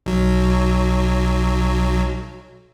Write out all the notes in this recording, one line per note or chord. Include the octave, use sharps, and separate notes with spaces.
B1 F#3